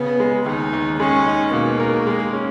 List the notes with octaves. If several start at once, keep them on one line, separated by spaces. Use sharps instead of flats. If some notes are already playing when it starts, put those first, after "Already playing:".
Already playing: C#3 B3
G#3
D#2 D#4
D#2
G#3 C#4
D#4
B2 A#3
A#4
G#3
C#4